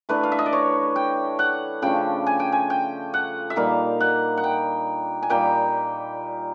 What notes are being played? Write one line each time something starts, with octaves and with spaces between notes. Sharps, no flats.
E3 A3 D4 B4
F5
E5
D#5
D5
C#5
G5
F#5
C#3 F3 A3 D4 G5
G#5
G5
G#5
G5
F#5
E5
A#2 G3 A#3 D#4 F5
F#5
F#5
G5
G#5
A#2 G3 A#3 D#4 G5